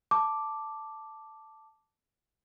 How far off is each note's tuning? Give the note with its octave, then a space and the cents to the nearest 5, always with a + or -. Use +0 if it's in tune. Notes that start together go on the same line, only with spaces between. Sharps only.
A5 +0 D6 +0